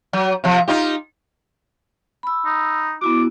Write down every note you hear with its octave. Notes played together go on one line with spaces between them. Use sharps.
F#3
C3 F3
D#4 F4 G4
B5 E6
D#4
B3 E4 F#4 D6